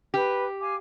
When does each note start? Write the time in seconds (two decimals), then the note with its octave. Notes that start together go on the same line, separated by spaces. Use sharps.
0.14 G4 B4
0.59 F5 G#5 D6